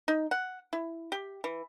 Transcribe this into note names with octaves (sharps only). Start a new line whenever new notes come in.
D#4
F#5
E4
G4
E3